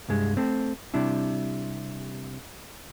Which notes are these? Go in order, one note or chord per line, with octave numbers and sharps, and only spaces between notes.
C2 G2 G#3
A3 C4
C3 G3 D4 E4